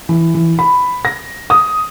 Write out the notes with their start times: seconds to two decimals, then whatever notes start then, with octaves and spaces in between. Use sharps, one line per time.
0.09 E3
0.35 E3
0.59 B5
1.05 A#6
1.50 D#6